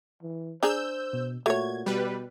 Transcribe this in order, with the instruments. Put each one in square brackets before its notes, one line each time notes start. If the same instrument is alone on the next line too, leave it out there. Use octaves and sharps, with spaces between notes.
[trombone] E3
[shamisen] D4 G#4 A#5 [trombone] C5 [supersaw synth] E6 G6
[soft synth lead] B2
[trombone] A#2 [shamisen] A3 C#5 [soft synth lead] F#4 [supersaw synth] G#6
[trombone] B2 [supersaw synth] G3 B4